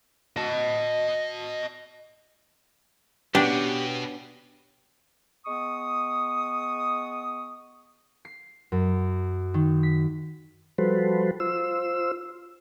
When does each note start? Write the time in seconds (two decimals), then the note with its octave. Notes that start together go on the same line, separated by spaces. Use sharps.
0.37 D#5 A5
3.35 B2 B3 C#4 D4 F#4 G4
5.46 G#3 B3 C#6 D#6
8.25 C7
8.72 F#2
9.54 D#3
9.83 B6
10.78 F3 G3 F#4 A4 B4 C5
11.40 F4 C5 E6